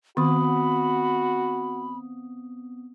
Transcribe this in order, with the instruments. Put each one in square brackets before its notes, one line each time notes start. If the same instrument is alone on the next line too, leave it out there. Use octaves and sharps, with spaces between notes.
[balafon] D#3 [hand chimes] B3 C4 D#6 [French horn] F#4 [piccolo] B5